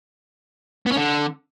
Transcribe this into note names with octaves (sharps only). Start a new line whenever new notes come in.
B3
C#4
D3